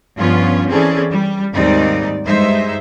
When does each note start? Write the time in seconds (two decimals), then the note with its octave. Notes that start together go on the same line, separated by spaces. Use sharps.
0.16 G2 F3 B3 C#4 F4
0.69 E3 C4 C#4 G#4 A4 D5
1.10 G3
1.53 D#2 G#2 G3 C4 D#4 D5
2.25 G2 G#3 D#4 C5 E5